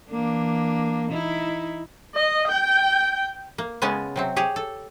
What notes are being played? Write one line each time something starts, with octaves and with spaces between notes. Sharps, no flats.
E3 A#3 D4
D#4 E4
D#5
G5
A#3
C#3 G#3 B3 C#4 G#5 A5
C3 F#3 C4
G4 G#4 C#5
A4